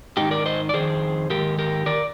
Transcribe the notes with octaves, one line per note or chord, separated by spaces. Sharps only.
G#2 D#3 D#4 G4
A#4 D5
C5 D#5
D5
F2 D#3 G#4 C5
G#2 D#3 G4 A#4
G4 A#4
D#3 A#4 D5